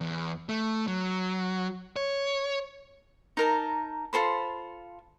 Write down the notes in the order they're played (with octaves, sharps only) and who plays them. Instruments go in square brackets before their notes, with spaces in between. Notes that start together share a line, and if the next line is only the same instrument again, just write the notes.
[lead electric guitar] E2
A3
F#3
C#5
[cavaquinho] D#4 A#4 A5
F4 A4 C5 B5